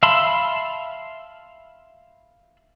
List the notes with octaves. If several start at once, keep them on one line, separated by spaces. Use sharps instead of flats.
E5 F5 A5 B5 C6